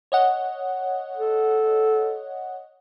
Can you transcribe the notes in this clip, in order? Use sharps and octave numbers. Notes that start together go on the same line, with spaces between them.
C#5 D#5 F#5
A4